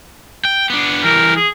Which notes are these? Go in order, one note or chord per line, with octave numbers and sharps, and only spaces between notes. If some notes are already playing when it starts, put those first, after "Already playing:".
G5
B3 D4
E3 G3 A#4
G#4